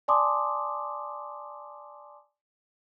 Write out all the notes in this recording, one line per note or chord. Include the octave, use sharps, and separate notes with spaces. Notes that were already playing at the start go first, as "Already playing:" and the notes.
D5 G#5 A5 C6 D6 D#6